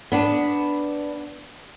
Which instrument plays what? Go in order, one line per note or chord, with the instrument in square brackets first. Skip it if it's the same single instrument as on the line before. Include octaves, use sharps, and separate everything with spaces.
[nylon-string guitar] B3 D4